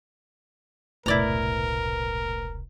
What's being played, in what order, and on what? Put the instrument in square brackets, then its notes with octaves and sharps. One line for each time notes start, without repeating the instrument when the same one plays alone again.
[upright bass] E1 C2 [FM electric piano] A2 B4 [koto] E4 D5 A#5 [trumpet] A#4